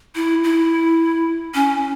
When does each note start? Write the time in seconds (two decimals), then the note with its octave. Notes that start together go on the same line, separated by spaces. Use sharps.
0.15 E4
0.44 E4
1.54 C#4